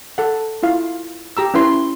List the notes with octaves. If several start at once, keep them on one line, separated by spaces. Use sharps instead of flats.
A4 F#5
E4 F4 F5
G4 A#5 E6
C#4 E4 B4 C6